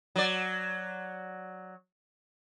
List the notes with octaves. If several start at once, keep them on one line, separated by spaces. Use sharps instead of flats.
F#3 D5